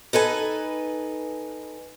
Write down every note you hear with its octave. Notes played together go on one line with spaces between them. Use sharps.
D#4 A4 B4 G#5